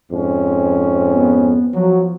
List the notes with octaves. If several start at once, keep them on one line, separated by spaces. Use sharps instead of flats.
F2 G#2 C#4
B3
F3 F#3